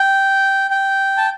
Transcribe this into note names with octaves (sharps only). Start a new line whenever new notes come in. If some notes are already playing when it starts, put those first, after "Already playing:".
Already playing: G5
G5
A5